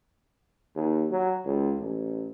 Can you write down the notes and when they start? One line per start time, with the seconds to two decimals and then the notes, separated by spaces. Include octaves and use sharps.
0.76 D#2
1.11 F#3
1.46 C#2
1.80 A1